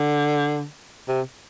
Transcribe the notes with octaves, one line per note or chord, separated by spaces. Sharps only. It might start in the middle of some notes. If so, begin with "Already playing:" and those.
Already playing: D3
C3